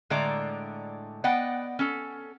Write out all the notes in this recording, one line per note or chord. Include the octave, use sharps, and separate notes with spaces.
A2 D3 G#3 D4 D5 A#5
B3 D5 D#5 F#5 G5
C#4 A4